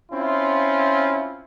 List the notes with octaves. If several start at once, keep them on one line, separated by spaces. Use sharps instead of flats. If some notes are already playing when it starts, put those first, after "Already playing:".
C4 C#4 E4 F4